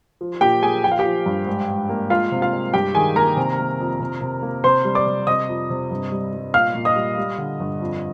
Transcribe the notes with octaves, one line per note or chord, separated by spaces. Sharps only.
F3
A#2 G4 G5
A#3 G#4 G#5
F3 G5
F5
G4 G5
F3
G2
G#2
G#2
A#3
G#3 F4 F5
C3
F4 F5
G#3
G2 G4 G5
D#3 G#4 G#5
A#3 A#4 A#5
C3
A#3
F2
C3
C3
A#3
C3 C5 C6
G3
D5 D6
C3
C3 D#5 D#6
F2
C3
G2
G3
G3
A#2 F5 F6
A#2
D#5 D#6
G3
G3
D3
G2
F2